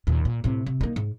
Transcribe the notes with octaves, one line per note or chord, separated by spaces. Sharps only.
D#2 A#2
A#2
A2 C3
C3
A#3 D#4
G#2